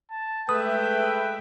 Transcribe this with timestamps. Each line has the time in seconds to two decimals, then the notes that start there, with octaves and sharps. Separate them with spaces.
0.11 A5
0.49 G#3 A3 B4 E5 G5 D#6